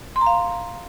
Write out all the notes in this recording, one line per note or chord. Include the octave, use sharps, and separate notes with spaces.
C6
A#5
F5